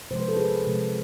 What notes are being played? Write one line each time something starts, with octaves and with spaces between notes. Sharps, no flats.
C3 F3 G#3 C5
B4
A4
G#4 B4
C3 F3 G#3